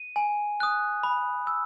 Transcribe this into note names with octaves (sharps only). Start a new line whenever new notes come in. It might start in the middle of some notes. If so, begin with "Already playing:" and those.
Already playing: D#7
G#5
D#6 F#6
B5
E6